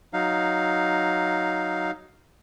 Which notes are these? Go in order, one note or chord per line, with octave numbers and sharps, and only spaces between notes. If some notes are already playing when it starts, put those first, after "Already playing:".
F#3 D#4 F5